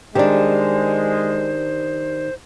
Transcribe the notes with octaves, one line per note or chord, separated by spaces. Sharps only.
D#3 G#3 D4 G4 C5 D5